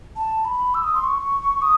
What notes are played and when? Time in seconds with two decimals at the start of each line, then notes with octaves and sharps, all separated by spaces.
0.16 A5
0.45 B5
0.74 E6
0.84 D#6
0.94 C6
1.04 C#6
1.62 D#6